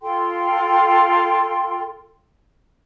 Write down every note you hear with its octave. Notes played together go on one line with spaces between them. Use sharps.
F4 A4 G5 C6